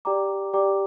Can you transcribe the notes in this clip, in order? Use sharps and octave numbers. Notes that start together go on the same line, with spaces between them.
G4 D5 G5 A#5 D6
G4 D5 G5 A#5 D6